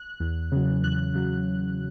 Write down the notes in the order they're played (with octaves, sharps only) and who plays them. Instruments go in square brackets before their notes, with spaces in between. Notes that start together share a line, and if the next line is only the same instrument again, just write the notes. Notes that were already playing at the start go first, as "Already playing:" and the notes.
Already playing: [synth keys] F#6
E2
C#3 F#3
E2 F#6
C#3 F#3